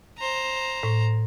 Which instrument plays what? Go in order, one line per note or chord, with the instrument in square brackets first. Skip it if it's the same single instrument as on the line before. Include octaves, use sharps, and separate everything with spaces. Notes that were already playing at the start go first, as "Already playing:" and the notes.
[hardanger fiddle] C5 A#5
[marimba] A2